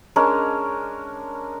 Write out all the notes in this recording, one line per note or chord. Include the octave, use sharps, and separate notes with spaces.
G#3 C#4 D4 A#4